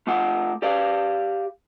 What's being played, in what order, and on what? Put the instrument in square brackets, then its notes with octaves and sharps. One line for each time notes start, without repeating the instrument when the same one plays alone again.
[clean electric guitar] A3 F4 F#5
G4 D5 F5